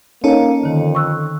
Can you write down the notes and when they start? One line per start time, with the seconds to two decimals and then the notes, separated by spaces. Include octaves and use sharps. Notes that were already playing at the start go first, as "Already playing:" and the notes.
0.24 A#3 C#4 D#4 A4
0.63 F2 D3 D#3
0.95 C#6 E6 F#6